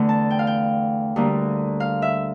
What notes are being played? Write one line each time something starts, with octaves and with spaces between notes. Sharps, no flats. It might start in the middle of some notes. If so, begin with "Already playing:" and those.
Already playing: E2 D3 A3
A5
G5
F5
G5
D2 D3 G3 A#3
F5
E5